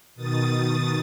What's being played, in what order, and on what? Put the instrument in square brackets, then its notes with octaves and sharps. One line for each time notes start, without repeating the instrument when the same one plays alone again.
[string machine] B2 D#3 D#6 A6